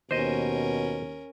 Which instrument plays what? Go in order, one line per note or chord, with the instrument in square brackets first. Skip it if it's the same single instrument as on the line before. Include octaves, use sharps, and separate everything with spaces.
[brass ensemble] D#2 [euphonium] B2 [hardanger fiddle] C#4 A#4 [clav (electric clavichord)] C5 D#5